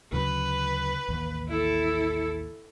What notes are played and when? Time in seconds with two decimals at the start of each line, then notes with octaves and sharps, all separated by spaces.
0.13 D2 C#3 F#3 B4
1.09 A1 D#2
1.49 E4 A4